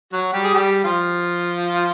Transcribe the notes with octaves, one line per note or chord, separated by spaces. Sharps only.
F#3 F#4
G3 G4
G#4
G3 G4
F3 F4